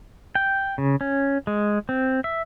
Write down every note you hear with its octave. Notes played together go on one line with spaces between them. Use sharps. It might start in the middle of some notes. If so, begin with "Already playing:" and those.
G5
C#3
C#4
G#3
C4
E5